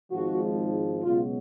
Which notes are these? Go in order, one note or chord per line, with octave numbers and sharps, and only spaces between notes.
G#1 G#2 F3 F#4
C#2 B2 F#3 F4